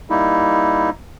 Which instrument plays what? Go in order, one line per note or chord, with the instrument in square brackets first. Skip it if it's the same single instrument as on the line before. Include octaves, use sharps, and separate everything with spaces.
[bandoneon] G3 A#3 D#4 E4